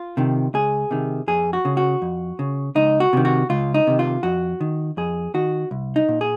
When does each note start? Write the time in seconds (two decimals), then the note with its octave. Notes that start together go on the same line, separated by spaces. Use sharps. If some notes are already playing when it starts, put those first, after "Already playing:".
Already playing: F4
0.17 C3 D#3
0.54 C#2 G#4
0.91 C3 D#3
1.28 F2 G#4
1.53 F#4
1.65 C#3
1.77 F#4
2.02 F2
2.39 C#3
2.75 C#2 D#4
3.00 F#4
3.13 C3 D#3
3.25 F#4
3.50 C#2 F4
3.74 D#4
3.87 C3 D#3
3.99 F4
4.23 F2 F#4
4.61 D#3
4.97 F2 G#4
5.34 D#3 F#4
5.71 C2
5.96 D#4
6.09 A#2
6.21 G#4